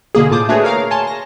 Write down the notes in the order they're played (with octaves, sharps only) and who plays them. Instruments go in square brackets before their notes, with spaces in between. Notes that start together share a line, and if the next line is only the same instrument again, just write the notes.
[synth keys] B2 D3 A#3 G#4
A2 F4 A5 D6 D#6 G6
A3 D4 F#4 G#4 B4 C#5
A#4 C#5 F5 A#5 F6
C#5 G#5 A5 C6
A#6